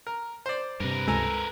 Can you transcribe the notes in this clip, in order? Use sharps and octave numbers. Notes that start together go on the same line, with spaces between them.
A#4
C5 D5
G2 C3 A#4 B4
C#2 A4 G#5 A#5